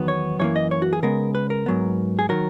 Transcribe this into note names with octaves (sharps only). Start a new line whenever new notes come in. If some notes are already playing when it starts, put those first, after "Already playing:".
Already playing: E2 D#3 F#3 B3
C#5
F#2 E3 A#3 C#5
D#5
C#5
F#4
G#4
C#3 G#3 B3 A#4
B4
A#4
G#2 F#3 B3
G#4
D#3 F#3 A#4